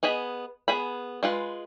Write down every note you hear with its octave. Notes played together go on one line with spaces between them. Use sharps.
B3 G#4 D#5 B5
B3 G#4 B5
G#3 F4 B4